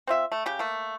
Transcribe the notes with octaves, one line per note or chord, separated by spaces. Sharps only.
C4 F4 E5
A3
C#3 G4
A3 A#3